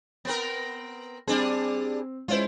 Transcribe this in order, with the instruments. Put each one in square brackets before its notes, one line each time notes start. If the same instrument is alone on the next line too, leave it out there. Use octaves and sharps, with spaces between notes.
[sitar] B3 C4 A#4
[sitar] G3 D4 G#4 [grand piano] C4
[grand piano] G#3 C#4 C5 [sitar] E4 F4